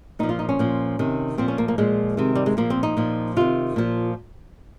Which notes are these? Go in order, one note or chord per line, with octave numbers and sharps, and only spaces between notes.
A#2 F3 D#4
F4
D#4
C#4
A#2 F3
C3 D#3
A#2 F3 C4
C#4
A#3
A#3
A#2 F3 G#3
C3 D#3
G3
G#3
A#2 F3 A#3
C4
D#4
A#2 F3
C3 D#3 F4
A#2 F3